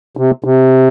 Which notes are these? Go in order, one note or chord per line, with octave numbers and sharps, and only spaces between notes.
C3
C3